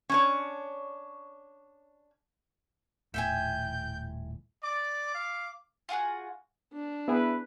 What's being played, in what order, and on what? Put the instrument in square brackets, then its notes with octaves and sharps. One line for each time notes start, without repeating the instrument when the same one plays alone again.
[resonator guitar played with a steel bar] C#4 D4 C#5
[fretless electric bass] D#1 A2 [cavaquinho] E5 G5 G#5 [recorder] G6
[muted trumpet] D5 [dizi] D6
[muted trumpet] F5
[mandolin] F4 F#4 G#4 F#5
[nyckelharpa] D4
[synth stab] B3 G#4 [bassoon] E4 [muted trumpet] B4